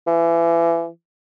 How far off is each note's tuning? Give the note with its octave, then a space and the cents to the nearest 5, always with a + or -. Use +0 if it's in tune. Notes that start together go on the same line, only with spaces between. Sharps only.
E3 +30